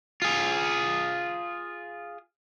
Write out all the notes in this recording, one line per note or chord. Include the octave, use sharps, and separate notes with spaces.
F4 G#4